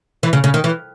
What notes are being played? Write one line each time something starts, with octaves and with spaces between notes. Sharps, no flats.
E3
C#3
C#3
D#3
E3